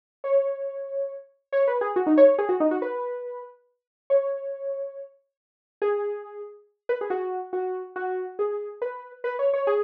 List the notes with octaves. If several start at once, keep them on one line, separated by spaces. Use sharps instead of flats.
C#5
C#5
B4
G#4
F#4
D#4
C#5
C#5
G#4
F#4
D#4
F#4
B4
C#5
G#4
B4
G#4
F#4
F#4
F#4
G#4
B4
B4
C#5
C#5
G#4